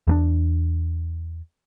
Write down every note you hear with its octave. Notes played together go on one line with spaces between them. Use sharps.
E2 A3 D4